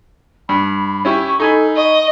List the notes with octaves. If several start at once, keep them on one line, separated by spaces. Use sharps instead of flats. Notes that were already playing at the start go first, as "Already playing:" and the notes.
G2 B5
C#4 E4 G4 C#6
D#4 A4 G#5 B5
D#5 C#6